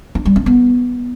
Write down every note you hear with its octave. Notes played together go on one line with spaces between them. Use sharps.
D4
G3
C#4
B3